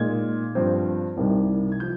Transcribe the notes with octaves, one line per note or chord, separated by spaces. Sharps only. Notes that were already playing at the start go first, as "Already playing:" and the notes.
Already playing: A#2 G#3 D#4 G#6
G2 F3 C4
C2 C3 G3 A#3 D#4
G#6
F3 G6